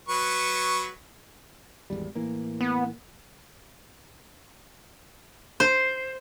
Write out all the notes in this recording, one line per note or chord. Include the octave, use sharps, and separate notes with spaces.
F#3 B4 C#6
G#1 E2 G3
A2 E3 A#3
B3
C5